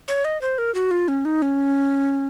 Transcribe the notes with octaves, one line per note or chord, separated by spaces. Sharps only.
C#5
D#5
C5
A#4
F#4
F4
C#4
D#4
C#4